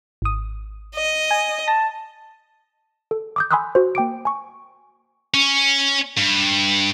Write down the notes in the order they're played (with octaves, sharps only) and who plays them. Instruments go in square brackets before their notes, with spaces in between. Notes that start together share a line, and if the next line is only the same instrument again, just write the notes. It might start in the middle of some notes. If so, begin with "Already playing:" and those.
[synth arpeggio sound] G#1 D#6
[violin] D#5
[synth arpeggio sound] G#5
[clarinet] A5 [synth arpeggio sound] A#6
[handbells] A4
D6 D#6 G6
G#5 B5 C6 D#6 E6 F#6
F#4 C5
A#3 G5 D6 D7
G#5 C#6
[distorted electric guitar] C#4
G2